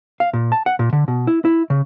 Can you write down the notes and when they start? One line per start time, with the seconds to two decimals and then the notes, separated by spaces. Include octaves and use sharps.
0.20 F5
0.33 A#2
0.52 A5
0.66 F#5
0.79 A#2
0.93 D3
1.08 B2
1.27 E4
1.45 E4
1.70 C#3